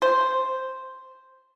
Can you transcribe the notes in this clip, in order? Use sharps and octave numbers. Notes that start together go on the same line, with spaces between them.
C5